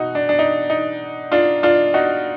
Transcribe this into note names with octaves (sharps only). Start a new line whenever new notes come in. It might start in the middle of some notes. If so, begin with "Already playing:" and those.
Already playing: B2 D#4 F#4
D4
D4
D#4
D#4
D4 F4
D4 F4
D#4 F#4